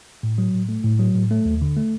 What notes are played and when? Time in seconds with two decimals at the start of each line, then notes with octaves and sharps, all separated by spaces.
0.23 A2
0.38 F#3
0.54 A2
0.69 A3
0.84 A2
0.99 F#3
1.15 A2
1.31 A3
1.45 D#2
1.62 D3
1.77 A3